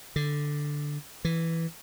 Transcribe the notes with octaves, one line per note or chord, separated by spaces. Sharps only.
D3
E3